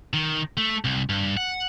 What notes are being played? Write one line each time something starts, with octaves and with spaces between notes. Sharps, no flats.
D#3
A3
C2
G2
F#5